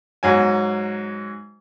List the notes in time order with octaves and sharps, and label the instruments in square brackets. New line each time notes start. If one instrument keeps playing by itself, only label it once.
[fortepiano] G#2 F#3 G#5